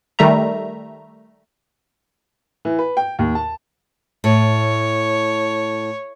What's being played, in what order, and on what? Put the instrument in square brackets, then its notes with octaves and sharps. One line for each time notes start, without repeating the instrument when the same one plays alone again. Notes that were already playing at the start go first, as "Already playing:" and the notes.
[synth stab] D#3 G3 A3 E5 A#5
[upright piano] E3
B4
G5
D#2
A5
[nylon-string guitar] A2 [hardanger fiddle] C#5